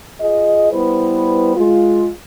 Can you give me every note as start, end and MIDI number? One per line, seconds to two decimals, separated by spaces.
0.21 0.70 65
0.21 0.70 68
0.21 0.70 75
0.72 1.54 55
0.72 1.54 59
0.72 1.54 64
0.72 1.54 71
0.72 1.54 72
1.56 2.09 56
1.56 2.09 65